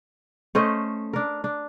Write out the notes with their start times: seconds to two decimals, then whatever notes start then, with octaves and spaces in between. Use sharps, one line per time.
0.55 A3 C#4 C5 D#5
1.13 D4 A#4
1.44 D4